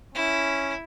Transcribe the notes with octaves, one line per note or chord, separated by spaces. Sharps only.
C#4 E4